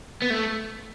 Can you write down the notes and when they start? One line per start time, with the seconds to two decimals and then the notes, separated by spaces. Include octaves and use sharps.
0.22 B3
0.30 A3